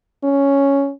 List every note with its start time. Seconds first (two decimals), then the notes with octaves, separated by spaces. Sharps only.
0.23 C#4